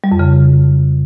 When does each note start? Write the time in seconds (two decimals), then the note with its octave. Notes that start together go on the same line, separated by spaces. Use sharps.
0.04 G3
0.12 F2
0.19 C#3